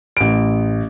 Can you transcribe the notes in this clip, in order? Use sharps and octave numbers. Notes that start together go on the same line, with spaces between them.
A1 D7